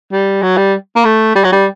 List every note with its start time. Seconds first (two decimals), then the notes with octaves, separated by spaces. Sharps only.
0.12 G3
0.42 F#3
0.57 G3
0.96 A#3
1.05 A3
1.35 G3
1.44 F#3
1.52 G3